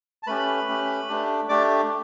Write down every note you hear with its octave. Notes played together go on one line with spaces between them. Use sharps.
A5
A3 C#4 G4 B4 B5
A3 C#4 G4
A3 D4 G4
A3 D4 G4 D5 D6